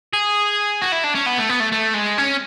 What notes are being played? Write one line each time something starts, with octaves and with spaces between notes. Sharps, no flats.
G#4
F#4
E4
D4
C#4
B3
A3
B3
A3
A3
G#3
C#4